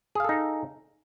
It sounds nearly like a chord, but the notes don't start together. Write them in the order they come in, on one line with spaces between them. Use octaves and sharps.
G#4 F5 A4 D#4